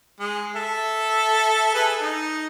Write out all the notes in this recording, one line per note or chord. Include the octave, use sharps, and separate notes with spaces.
G#3
A4 E5
G#4 A4 B4
D#4 D#5